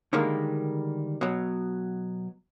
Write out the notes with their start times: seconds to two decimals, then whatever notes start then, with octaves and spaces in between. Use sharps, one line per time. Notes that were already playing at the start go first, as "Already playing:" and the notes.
0.13 D3 D#3 G3 G#3 A#3
1.21 B2 F#3